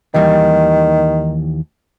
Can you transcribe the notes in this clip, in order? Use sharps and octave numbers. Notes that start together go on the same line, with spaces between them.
D#2 D#3 E3 G3